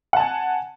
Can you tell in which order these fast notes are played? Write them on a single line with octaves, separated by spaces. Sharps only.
F#5 A5 G#5